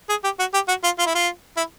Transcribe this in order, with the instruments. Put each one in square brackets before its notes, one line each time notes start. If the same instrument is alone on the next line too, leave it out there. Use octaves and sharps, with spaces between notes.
[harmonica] G#4
G4
F#4
G4
F#4
F4
F4
E4
F4
E4